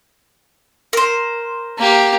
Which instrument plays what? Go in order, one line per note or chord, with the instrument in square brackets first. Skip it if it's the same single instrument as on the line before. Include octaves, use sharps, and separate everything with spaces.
[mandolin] A#4 C5
[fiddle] A#3 G4